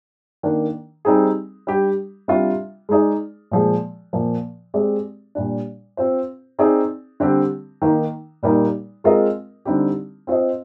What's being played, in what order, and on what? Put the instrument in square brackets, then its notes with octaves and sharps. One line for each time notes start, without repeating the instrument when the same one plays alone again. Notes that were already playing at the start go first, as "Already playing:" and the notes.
[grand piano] D#3 A#3 D4
G3 C4 D#4 G#4
G3 D4 G4
C3 G3 D4 F4
G#3 D#4 G#4 D5
A#2 F3 G#3
A#2 F3 A#3
G#3 C4 G4 D5
A#2 G3 D4
C4 F4 C5
C4 D#4 G#4 D5
D3 G3 C4 G4
D#3 A#3 D#4
A#2 G3 A#3 D#4
G#3 C4 F4 A#4 D#5
D3 G3 C4 D#4 G4
C4 F4 C5 D#5